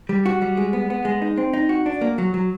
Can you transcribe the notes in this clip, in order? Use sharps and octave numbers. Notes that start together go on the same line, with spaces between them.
G3
F#4
G3
G#3
B3
B3
G#3
D#4
C4
D#4
F#4
D4
A#3
F#3
F#3